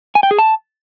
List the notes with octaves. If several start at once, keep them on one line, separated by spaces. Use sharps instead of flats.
G#5
G5
G#4
A5